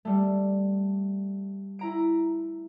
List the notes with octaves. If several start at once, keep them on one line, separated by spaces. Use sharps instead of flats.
G3 A3
E4 A#5 D7